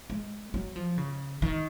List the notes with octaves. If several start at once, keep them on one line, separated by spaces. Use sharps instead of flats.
G#3
F#3
F3
C#3
D#3